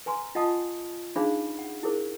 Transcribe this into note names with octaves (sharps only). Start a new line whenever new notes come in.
B4 G#5 A#5 C6
F4 D#5 F#5 A5 D#6
D4 D#4 G#4 C5 F5 B5
F#5
E4 G#4 A#4 C5